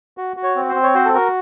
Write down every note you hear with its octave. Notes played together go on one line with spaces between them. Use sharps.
F#4
F#4
C#5
C4
C5
C4
C#5
F#4 C5
A4
F#4 A#4